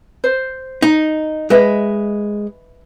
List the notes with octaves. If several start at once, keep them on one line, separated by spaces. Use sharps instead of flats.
C5
D#4
G#3 B4 D#5 E5